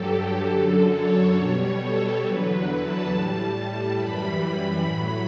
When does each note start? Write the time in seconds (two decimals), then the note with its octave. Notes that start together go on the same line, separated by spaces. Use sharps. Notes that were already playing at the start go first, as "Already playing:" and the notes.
Already playing: G2 F#3 G4 A4
0.20 G4
0.49 F#2 D3 F#3 A4
0.92 C#5
1.35 B2 G3 C#5
1.79 A4
2.22 E2 D3 F#3 B4
2.52 B4
2.80 A5
3.10 A2 G3
3.96 F#2 E3 G3 B5
4.83 A2 F#3